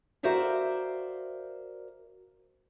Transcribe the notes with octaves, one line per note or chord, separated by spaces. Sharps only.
F#4 A#4 C5 D5 E5 F5